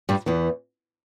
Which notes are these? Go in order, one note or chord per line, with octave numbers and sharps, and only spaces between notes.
G2 G3
E2 E3